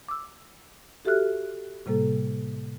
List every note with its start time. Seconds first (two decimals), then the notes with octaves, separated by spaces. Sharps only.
0.08 D6 E6
1.05 F#4 G4 A4 E5 F6 F#6
1.86 A2 C3 G3 A#3 A4